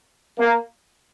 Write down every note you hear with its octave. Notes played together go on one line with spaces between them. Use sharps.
A#3